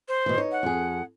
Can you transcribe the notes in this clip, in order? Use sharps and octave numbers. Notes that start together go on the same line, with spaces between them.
C5
B2 E3
D#4 C#5
F#5
F2 G#4